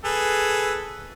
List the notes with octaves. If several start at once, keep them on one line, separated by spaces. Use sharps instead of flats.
G#4 A4 B4